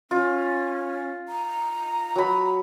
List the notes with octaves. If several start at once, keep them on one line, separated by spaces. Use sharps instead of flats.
C#4 F4
A#5
F#3 B5